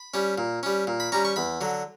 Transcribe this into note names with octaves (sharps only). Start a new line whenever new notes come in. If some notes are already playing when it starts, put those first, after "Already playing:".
Already playing: B5
G3 C#4
A#2
G3 C#4
A#2
B5
G3 C#4 A#5
C#6
E2 B5
D3 F#3